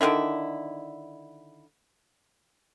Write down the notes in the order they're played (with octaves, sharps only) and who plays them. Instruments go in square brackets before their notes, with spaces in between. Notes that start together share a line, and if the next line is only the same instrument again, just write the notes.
[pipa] D3 D#3 F3 E4